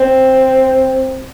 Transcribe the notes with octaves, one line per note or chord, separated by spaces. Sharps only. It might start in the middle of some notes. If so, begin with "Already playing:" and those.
Already playing: C4